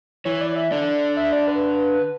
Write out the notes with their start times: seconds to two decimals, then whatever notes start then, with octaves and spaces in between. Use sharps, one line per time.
0.25 E3 C#5
0.41 D5
0.56 E5
0.71 D3 D5
1.17 E5
1.32 D5
1.47 B4